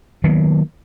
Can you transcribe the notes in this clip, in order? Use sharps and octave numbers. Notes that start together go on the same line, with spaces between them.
D#3 F#3 A#3 B3